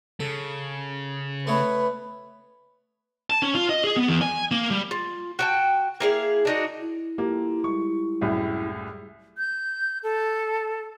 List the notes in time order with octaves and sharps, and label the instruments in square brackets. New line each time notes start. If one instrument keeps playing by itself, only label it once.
[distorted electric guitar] C#3 [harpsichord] A4
[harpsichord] A3 B3 C#5 [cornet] B4
[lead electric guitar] A5
C#4
F4
D#5
G#4
B3
E2
G#5
A#3
G3
[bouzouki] F4
F#4 G5 A5
A#3 E4 G#4 F5
D4 D#4 F#4
[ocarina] E4
[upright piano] A#3 [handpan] F4 G4 A4
[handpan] G3 G#3 [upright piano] C#6
[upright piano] C2 F#2 A2 [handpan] A3 G#4
[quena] G6
A4